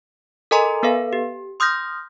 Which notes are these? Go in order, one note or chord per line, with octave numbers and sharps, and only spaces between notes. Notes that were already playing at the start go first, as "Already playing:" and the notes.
A4 A#4 D#5 G#5 A#5 C6
B3 A4 B4 F5
G4
C6 D#6 F6 G6 A#6